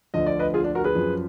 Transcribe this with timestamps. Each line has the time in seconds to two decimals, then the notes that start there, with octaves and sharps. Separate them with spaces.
0.14 D2 D3 F3 D#5
0.26 D5
0.39 B4 D#5
0.54 F4 G#4
0.64 D4
0.75 F#4 A#4
0.84 G#4 B4
0.95 F#2 F3